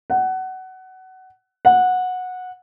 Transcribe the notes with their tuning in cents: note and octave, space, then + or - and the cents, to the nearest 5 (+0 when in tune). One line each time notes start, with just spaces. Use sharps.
F#5 +20
F#5 -15